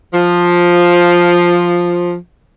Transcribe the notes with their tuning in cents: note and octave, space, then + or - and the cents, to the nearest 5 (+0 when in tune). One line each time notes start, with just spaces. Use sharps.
F3 +5